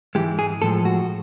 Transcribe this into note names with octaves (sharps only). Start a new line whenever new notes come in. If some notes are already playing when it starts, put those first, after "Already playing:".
G#2 E3 G#3 G4
G#4
A2 F3 G#3 A4
F#4